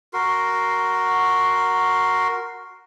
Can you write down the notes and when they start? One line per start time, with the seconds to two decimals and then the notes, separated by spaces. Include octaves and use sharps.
0.13 F#4 A#4 C6